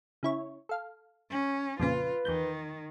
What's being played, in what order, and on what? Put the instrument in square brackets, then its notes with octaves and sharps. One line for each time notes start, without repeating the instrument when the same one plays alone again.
[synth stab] C#3 E4 C#5
A4 F5
[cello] C#4
[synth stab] F2 A#2 C#3 [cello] F4 [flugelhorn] B4
[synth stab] E2 G6 [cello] D#3